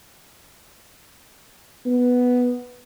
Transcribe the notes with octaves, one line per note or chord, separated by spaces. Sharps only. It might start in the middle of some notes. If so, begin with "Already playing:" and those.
B3